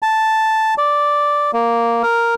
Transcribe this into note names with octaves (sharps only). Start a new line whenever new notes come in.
A5
D5
A#3
A#4